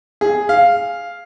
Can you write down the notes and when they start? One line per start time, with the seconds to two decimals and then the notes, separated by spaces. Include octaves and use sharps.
0.21 G#4
0.49 F5